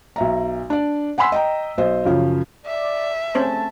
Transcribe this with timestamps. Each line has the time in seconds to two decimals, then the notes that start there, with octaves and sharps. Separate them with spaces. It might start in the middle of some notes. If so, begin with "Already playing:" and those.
0.16 B1 E5 A#5
0.70 D4 D5
1.18 F#5 G#5 B5 C6 E6 B6
1.32 D#5 G5 A#5
1.78 B1 C5 D#5
2.05 F#2 C#3 F3
2.66 D5 E5
3.35 A3 C4 C#4 C5 A5